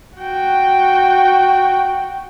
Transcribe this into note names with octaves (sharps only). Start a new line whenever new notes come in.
F#4 G5